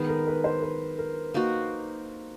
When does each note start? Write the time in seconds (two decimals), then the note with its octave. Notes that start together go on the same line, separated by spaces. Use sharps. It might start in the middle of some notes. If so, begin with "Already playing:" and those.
Already playing: D#3 G#3 B3 D#4
0.09 A#4
0.27 B4
0.44 C5
0.62 B4
0.98 A#4
1.34 A#3 D#4 F#4